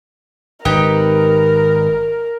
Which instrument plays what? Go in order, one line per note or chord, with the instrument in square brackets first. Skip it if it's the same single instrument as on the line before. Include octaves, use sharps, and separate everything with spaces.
[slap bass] G#1 [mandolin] D#4 G4 B4 [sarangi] A#4